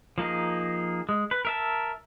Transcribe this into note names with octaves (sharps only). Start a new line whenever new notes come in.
F3 A#3 D#4 G#4
G#3
B4
A#4 E5 A5